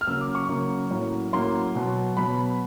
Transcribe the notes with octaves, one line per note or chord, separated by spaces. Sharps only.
F6
C#3 F#3 A#3 E6
D6
C#6
C#3 F#3 A#3
A2 F#3 A#3 C#4
A2 F#3 A#3 C#4 C6
B2 F#3 B3
B2 F#3 B3 B5